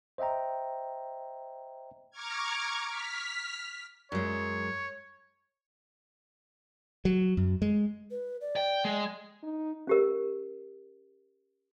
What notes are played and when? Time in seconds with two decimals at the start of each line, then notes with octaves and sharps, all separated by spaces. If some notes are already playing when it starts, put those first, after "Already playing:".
0.18 C5 D#5 E5 G5 A#5
2.11 A#5 C#6 D6 F6 G#6
2.86 F6 B6
4.12 F#2 G#3 C#5
7.05 F#3
7.37 F#2
7.62 G#3
8.11 B4
8.41 D5
8.56 G5
8.85 G#3
9.43 D#4
9.87 C#4 G4 A#4